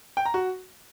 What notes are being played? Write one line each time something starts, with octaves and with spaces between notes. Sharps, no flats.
G5
A#5
F#4